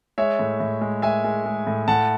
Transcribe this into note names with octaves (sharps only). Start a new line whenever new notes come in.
G#3 C#5 E5
A2
A2
G#3
G#3 E5 G#5
G#3
G#3
A2
A2 F#5 A5